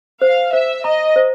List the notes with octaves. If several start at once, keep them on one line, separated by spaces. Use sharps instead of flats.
C5 F5
C5 E5
D#5 A#5
C5